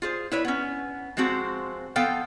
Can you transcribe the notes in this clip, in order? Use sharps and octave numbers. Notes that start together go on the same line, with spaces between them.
F4 G#4 C5
E4 B4 C#5
B3 C#4
F3 G#3 C4 F#4 C5
F3 B3 A4 F5 G5